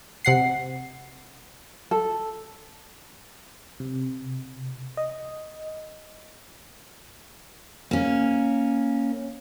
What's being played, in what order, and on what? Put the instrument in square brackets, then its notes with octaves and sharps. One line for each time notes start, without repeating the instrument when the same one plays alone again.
[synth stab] C3 F#5 C7
[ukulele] A4
[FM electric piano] C3
D#5
[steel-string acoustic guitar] A#3 C#4